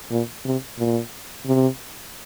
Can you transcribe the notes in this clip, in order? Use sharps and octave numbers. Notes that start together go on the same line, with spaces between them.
A#2
C3
A#2
C3